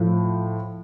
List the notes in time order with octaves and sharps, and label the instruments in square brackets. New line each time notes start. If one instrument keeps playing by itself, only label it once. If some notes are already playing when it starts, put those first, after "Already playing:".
Already playing: [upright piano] A2 F3